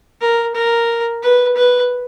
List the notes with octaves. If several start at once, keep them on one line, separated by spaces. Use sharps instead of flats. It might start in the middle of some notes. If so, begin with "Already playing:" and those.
A#4
A#4
B4
B4